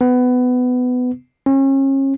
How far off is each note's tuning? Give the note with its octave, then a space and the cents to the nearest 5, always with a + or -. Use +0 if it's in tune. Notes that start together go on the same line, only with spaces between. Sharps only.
B3 +20
C#4 -35